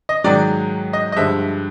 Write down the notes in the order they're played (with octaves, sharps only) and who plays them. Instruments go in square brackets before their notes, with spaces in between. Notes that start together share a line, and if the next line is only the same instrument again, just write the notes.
[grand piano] D#5
G#2 D#3 F#3 D5
D#5
D#5
G2 D3 F3 G#3 E5